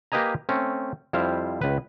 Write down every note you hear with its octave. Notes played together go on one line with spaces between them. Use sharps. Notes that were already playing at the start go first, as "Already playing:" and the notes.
A#3 G4 B4 D#5 G#5 A#5
A3 C4 C#4
F2 G3 E4 C5 F5
C#2 B4